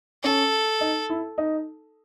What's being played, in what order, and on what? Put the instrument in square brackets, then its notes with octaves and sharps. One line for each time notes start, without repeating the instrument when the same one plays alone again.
[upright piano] C#4 [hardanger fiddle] A4
[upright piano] D#4
E4
D#4